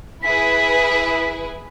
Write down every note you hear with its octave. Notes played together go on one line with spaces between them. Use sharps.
E4 G#4 B4 B6